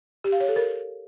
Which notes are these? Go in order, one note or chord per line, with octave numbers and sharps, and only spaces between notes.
G4
F5
C#5
A4
A#4